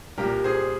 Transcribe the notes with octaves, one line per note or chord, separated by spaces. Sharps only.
C2 A#2 G3 G4 A#4
G#4 C5